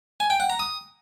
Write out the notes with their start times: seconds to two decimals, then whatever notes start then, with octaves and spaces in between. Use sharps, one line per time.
0.20 G#5
0.30 G5
0.40 F#5
0.50 A#5
0.59 D#6